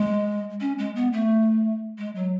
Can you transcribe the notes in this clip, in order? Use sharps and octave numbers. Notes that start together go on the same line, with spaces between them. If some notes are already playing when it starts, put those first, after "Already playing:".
Already playing: G#3
C#4
G#3
B3
A3
G#3
F#3